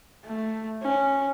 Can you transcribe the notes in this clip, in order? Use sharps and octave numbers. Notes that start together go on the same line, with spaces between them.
A3
C#4